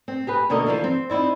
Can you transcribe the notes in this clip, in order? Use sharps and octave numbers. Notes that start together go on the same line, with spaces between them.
C4
G4 G#4 B4
D2 B2 D3 A#3 A#4 D#5
D3 E3 F3
C4
C4 D#4 E4 D5